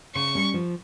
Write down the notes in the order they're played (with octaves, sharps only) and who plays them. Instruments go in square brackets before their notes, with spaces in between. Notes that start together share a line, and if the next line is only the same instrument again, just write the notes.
[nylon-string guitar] C#3 [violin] C#6
[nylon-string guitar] G3 C#4
F3